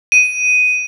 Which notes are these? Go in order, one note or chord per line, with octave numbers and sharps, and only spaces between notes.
D#7